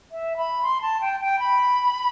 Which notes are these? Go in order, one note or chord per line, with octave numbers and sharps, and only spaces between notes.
E5
B5
C6
A5
G5
G5
B5